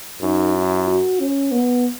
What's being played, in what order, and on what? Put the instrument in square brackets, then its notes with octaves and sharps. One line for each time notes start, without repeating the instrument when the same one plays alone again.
[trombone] F#2 [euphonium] D#4
[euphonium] E4
F#4
C#4
B3